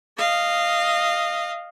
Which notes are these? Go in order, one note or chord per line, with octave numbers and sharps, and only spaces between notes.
D#5 F5